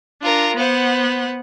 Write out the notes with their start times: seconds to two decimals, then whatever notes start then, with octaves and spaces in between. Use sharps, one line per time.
0.22 D4 F4 A#4
0.57 B3 C5 F#5